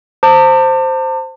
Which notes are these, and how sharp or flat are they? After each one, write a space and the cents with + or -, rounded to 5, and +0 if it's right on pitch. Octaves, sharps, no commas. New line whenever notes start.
C5 +0 A5 +40 D6 +25